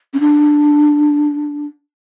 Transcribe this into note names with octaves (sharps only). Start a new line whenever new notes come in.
C#4
D4